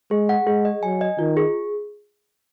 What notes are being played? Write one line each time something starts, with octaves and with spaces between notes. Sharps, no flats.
G#3 G#4
F#5
G#3 G#4
D#5
F#3 G#5
D#5
D#3 F4
G#4